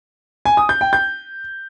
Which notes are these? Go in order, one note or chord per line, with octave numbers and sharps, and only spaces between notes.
G#5
D#6
G6
G5
G6